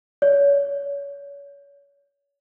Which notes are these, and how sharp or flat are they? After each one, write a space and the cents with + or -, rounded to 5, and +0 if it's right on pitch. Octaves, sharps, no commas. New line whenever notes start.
C#5 +30